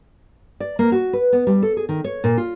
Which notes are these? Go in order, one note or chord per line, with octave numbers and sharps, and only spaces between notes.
D5
A#3
F#4
B4
B3
G3
A4
G#4
D#3
C#5
A#2
F4